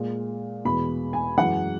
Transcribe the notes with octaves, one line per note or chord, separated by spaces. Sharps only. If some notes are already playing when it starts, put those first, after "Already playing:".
Already playing: A#2 G#3
E2 B2 G#3 B5
G#5
F#2 E3 G#3 F#5